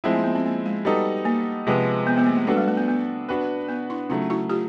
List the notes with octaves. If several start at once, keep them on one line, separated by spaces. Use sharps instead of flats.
F3 G#3 A3 C4 E4
A#3
B3
C4
A#3
G#3
G3 B3 D#4 F#4 A4
A#3
C3 F3 G#3 B3
B3
B3
A#3
A3
G#3 B3 D4 F#4 A4
G3
A3
B3
B3
B3 D4 F#4 B4
B3
D4 E4
C#3 F#3 A3 D#4 F4
E4 F#4
F4 G4